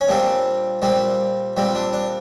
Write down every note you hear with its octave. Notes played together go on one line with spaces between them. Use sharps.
C#4
A#2 G3 C4 D4
A#2 G3 C4
A#2 G3 C4
D4
D4